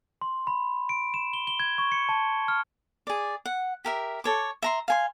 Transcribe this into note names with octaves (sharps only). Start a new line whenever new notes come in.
C6
B5
D7
E7
G7
G7
G#6
C#6
C#7
A5
F6
G#4 D5
F#5
G4 A#4 E5
A4 C#5 D6
E5 A#5 C6
F5 G#5 C6